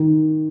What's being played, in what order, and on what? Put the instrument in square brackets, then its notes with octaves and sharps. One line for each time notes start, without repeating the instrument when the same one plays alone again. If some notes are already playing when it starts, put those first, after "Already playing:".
Already playing: [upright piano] D#3